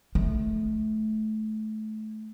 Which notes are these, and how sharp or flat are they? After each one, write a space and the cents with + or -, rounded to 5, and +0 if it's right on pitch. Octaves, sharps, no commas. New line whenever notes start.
A3 -25